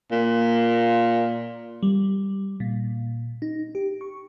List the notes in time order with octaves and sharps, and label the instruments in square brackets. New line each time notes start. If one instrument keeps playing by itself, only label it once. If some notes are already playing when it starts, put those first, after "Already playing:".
[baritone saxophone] A#2
[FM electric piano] G3
A#2
D#4
G4
C#6